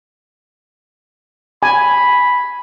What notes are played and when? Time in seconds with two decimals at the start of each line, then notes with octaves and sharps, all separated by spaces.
1.63 G#5 B5